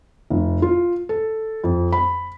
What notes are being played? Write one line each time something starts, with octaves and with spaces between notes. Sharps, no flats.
F1
F4
A4
F2
B5